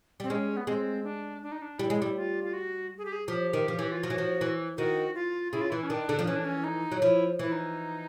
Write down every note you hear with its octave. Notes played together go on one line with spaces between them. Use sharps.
G3 C4
G#3 C#4
B3
G#3 C4
D4
D4
D#4
D4
G3 E4
G#3
G3
F4
F4
F#4
G#4
G4
G#4
F3 G4
D#3
F3
E3
F4
F3 F#4
E3
F3
E3
D#3 F#4
F4
C#3 E4
F4
E3 E4
C#4
D#3 D4
D3
F3
E3 C#4
D4
C#4
D#4
F#3
F3 E4
E3 E4
D#4